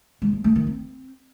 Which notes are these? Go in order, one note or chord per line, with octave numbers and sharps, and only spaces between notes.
G#3
F3
A3
D#3
C4